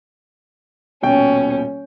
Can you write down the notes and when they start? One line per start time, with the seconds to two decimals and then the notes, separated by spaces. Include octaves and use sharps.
1.03 D#1 B2 C#4 G5